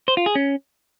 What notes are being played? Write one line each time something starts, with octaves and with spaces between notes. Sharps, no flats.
C5
F4
G#4
C#4